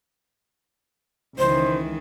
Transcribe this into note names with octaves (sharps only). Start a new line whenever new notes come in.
C#2 D#3 E3 C5